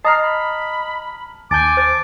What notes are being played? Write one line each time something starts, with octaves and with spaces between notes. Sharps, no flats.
D#5 A5 A#5 D#6 F6 C7
B5
D#2 G#5 A5 D6 G6 A6
C5 A6